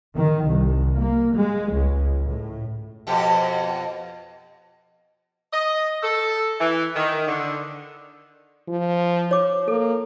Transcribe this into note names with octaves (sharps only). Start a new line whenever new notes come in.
D#3
C2
A#3
G#3
C#2
A2
F2 B2 G4
D#5
A4
E3
D#3
D3
F3
C#5 D6
A#3 A4